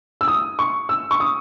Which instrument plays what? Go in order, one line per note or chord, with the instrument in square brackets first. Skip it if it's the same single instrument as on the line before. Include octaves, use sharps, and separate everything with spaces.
[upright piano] E6
D#6
C#6
E6
C#6
D#6